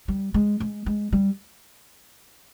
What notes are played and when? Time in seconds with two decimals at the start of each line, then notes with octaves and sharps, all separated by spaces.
0.08 G3
0.34 G#3
0.60 G#3
0.86 G#3
1.12 G3